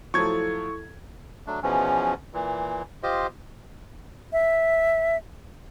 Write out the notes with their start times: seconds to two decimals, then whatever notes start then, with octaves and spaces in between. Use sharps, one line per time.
0.14 F3 F#3 A3 E4 A4 C#6 G#6
1.46 F#3 A3 D4
1.63 E2 B2 E3 F3 C#4
2.34 A#2 E3
3.03 F4 G4 C5 D#5
4.33 E5